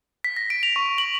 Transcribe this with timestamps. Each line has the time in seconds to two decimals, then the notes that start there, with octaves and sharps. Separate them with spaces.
0.24 B6
0.37 A#6
0.50 D7
0.63 F7
0.76 C#6
0.98 F#7